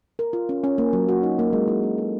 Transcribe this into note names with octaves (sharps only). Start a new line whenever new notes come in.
A#4
F4
C#4
C#4
A#3
F#3
F#4
D#4
A#3
G#3
E4
C#4
A4